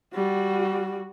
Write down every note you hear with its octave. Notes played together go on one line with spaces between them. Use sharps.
G3 F#4